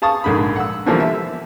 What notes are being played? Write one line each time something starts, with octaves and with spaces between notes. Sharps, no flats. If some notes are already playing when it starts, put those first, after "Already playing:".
G#4 F5 A5 C#6 D#6
A#1 G#2 D3 G#4 B5
F#5 E6
B2 D3 E3 F3 G3 A#3
E5